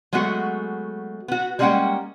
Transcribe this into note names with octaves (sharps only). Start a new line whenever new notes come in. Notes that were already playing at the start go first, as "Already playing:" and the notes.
F#3 G#3 A3 B3 F#4
B3 F#4
G3 G#3 A#3 C#4 F#5 G5